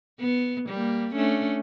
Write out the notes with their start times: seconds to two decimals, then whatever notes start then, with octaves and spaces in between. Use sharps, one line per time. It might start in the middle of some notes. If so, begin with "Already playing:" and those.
0.20 B3
0.69 G3 A#3
1.14 A3 C#4 D4